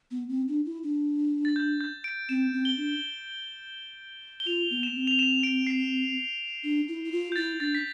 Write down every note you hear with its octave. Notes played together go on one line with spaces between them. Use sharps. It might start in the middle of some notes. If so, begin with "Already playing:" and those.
B3
C4
D4
E4
D4
A6
G6
G6
D7
C4 E7
C4
G7
D4
G7
F4 F7
B3
E7
C4
F7
E7
D7
C7
D4
E4
E4
F4
G6
E4 A6
D4 A6
B6